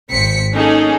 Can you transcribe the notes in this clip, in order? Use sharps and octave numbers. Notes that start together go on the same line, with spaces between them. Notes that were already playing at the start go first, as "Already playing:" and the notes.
G#1 C4 B6 C#7
A#3 C#4 D#4 G#4 A4